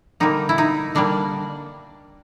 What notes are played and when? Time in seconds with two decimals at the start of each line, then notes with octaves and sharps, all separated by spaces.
0.20 D3 G3 A#3 D#4
0.49 E4
0.58 D#4
0.95 D3 G3 A#3 D4